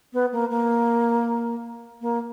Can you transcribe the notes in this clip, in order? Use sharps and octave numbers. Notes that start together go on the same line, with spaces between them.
B3
A#3
A#3
A#3